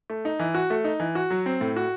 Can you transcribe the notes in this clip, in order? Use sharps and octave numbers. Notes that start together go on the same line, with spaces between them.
A3
D#4
E3
F#4
A3
D#4
E3
F#4
F#3
C4
A2
F#4